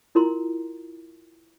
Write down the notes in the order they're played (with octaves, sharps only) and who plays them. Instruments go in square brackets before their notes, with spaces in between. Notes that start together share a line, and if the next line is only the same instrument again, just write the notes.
[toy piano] E4 F4 A#4 A#5 C6